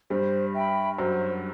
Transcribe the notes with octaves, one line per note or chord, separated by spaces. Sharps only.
G2 G3 C5
E5 G5 B5
F#2 F#3 C5